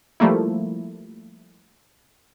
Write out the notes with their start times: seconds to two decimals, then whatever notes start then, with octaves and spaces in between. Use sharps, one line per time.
0.20 F3 G3 A3 A#3 E4